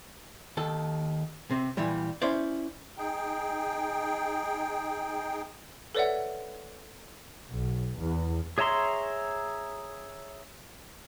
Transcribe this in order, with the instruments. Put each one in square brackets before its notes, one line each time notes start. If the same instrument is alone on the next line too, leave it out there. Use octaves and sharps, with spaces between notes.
[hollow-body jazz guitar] D#2 D#3 A4
C3 C4
A#2 E3 G3
C#4 E4 C5 D5
[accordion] D#4 G#4 G5
[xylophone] A4 B4 C#5 D5 E5 F#5
[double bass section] B1
E2
[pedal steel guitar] G#4 C#5 E5 A#5 C6